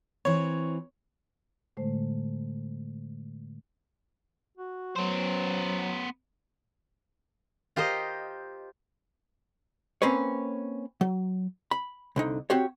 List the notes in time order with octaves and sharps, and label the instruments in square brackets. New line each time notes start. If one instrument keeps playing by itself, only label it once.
[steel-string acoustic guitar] E3 C4 [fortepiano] C#5
[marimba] A2 D3 G#3 A3 C5
[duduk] F#4
[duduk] F#3 [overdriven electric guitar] B3 C5
[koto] F4 G4 A#4 C5 D#5
[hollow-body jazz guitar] A#3 C4 C#4 B4 C#5
F#3
B5
C2 D3 D#4
C4 F#4 G4 C#5